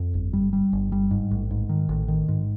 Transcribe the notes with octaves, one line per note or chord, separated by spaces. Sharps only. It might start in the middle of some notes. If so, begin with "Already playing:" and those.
Already playing: F2
G1
G3
G3
G1
G3
G#2
A1
G#2
D#3
A1
D#3
G#2